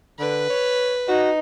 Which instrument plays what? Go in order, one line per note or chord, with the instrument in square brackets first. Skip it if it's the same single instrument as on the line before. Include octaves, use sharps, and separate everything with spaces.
[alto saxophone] D3 [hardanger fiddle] B4
[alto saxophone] C#5
[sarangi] D#4 [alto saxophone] F#4